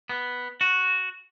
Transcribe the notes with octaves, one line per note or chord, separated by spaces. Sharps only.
B3
F#4